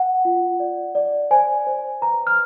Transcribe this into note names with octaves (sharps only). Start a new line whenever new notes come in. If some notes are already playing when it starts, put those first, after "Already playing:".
Already playing: F#5
F4
D5
D5
C5 G#5
C5
B4 A#5
F6